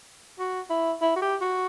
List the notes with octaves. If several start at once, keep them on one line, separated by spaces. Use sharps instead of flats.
F#4
E4
E4
F#4
G4
F#4